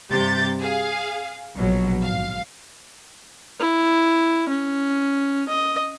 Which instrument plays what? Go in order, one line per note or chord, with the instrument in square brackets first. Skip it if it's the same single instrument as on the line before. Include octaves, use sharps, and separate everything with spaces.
[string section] G2 C3 G4 G6 A6
G#4 F5
A#1 B2 F#3
G#1 F5
[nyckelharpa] E4
C#4
D#5